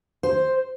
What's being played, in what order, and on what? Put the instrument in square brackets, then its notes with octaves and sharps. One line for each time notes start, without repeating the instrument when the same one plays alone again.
[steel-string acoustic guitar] C5